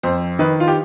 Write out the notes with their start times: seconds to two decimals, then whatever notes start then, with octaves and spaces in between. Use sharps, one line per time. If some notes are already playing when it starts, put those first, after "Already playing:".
0.03 F2 C5
0.39 D#3 B4
0.60 F4
0.68 G4